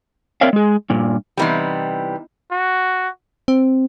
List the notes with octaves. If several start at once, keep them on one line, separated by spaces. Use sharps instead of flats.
C4 A#4 C#5 D5 E5 F5
G#3 G#4
G2 A#2
C3 E3 G3 B3 D#4 E4
F#4
C4